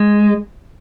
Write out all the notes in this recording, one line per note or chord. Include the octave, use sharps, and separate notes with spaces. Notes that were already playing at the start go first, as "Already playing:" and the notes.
Already playing: G#3